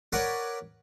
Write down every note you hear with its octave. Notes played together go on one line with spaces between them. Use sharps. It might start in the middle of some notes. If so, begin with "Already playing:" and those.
A#4 B4 C#5 D5 F#5